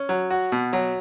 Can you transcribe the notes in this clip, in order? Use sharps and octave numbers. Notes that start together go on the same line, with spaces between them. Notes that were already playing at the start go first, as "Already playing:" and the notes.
Already playing: C#4
F#3
F#4
B2
F#3